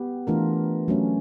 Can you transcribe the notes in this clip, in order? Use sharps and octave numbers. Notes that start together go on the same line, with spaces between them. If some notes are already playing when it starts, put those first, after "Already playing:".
Already playing: B3 G4
E3 A3 D4 F4 A#4
F#3 A3 C#4